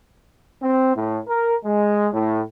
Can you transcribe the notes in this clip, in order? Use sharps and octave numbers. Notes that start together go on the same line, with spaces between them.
C4
A2
A#4
G#3
A2